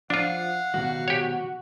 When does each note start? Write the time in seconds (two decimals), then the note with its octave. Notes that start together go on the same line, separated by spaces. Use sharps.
0.10 F3 D4 F4 F5 F#5
0.74 B2 D#3 G3 F#4
1.08 G4 C#5